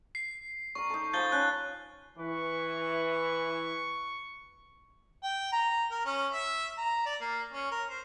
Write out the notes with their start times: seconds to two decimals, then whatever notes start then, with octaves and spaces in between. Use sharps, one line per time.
0.15 C7
0.75 A#4 D5 C#6
0.90 D#4 A4
1.13 F3 G#5 B5 G6 A6 G7
1.32 C#4 F#6 G6
2.18 E3 B4 C#6
5.24 G5
5.52 A#5
5.91 A#4
6.06 C#4
6.33 E5
6.78 A#5
7.06 D5
7.21 A#3
7.53 C#4
7.72 A#4
7.89 C5